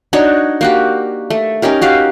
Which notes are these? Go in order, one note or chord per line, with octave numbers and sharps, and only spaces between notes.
D4 D#4 F#4 C#5
A#3 F#4 G4
A3
C#4 D#4 G4 A#4
F#4 G4 F5